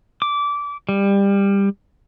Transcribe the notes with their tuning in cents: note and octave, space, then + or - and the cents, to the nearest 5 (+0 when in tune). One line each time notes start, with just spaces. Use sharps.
D6 -20
G3 +20